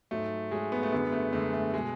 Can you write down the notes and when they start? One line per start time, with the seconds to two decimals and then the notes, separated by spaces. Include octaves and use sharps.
0.11 G#2 F#3 A3
0.51 G#2 F#3 G#3
0.72 B3
0.83 A3
0.92 F#2 D3 G#3 B3
1.12 A3
1.33 F#2 D3 G#3 A3
1.53 A3
1.74 B2 G#3